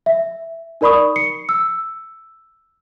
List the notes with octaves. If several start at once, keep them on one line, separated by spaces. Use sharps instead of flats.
E5
D#4 A#4 D5 B5 C#6 D#6
C7 C#7
E6